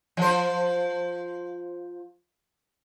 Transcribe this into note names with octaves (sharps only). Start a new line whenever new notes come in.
F3 C5